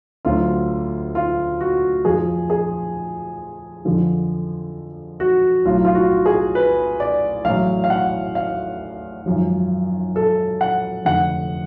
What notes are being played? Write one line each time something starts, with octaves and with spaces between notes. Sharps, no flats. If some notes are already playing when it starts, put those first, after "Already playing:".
D2 D3 F#3 F4
F4
F#4
F2 G#4
F3
G#4
F2 D3 F3
F#4
B1 A2 F#3 F4
F4
F#4
G#4
B4
D5
A1 A2 F#3 F5
F5
F#5
F5
G#1 F#2 F3
A4
F#5
F1 F2 D3 F#5